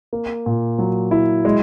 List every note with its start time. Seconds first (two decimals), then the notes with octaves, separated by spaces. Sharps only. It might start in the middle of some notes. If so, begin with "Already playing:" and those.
0.13 A#3
0.46 A#2
0.79 F#3
1.11 E4
1.45 G#3